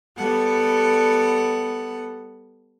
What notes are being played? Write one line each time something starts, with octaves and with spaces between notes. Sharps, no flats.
G3 B3 A4 F#5